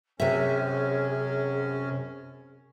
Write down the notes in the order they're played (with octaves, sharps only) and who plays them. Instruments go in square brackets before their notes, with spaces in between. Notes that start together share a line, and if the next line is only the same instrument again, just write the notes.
[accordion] F#2 C#4 [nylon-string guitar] C3 E5 [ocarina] G#4